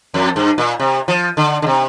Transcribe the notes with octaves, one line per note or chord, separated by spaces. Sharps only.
F2
G2
A#2
C3
F3
D3
D3
C3